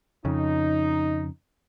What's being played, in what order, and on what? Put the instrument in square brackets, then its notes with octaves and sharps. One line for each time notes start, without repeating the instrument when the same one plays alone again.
[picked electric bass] F2 C#3 [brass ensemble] D#4